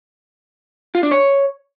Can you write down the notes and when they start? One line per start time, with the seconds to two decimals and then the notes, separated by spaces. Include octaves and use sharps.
0.95 F4
1.03 D4
1.11 C#5